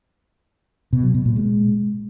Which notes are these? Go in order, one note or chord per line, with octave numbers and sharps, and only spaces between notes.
B2
F#3
B2
A#2
G#3